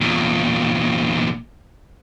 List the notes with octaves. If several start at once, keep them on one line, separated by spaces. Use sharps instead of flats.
E2 A#2